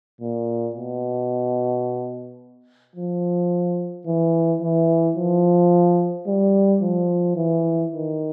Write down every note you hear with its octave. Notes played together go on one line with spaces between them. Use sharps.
A#2
B2
F3
E3
E3
F3
G3
F3
E3
D#3